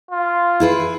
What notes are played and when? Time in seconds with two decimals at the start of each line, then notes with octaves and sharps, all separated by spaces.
0.11 F4
0.60 E4 G#4 B4